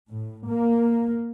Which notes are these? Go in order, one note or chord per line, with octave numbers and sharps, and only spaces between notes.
A2
A#3